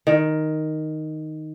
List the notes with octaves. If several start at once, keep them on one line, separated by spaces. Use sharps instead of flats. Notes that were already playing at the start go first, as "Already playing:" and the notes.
D#3